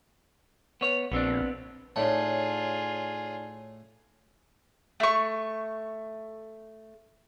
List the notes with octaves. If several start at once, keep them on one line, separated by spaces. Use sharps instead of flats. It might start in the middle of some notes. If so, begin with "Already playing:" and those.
B3 C#5
A#1 B3 C4 D4
A2 D#4 F4 G#4 C#5 D5 A5
A3 C#6